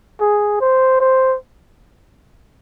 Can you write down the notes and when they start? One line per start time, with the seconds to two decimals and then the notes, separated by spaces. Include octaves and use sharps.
0.21 G#4
0.61 C5
1.01 C5